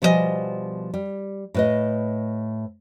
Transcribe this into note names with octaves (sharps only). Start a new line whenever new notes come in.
B2 F3 G3 G4 D#5 G#5
G3
A2 B4 D#5